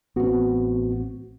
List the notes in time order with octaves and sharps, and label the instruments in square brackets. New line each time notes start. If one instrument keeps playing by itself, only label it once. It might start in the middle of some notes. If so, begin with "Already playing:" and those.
[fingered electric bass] A1 C4 [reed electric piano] B3 F#4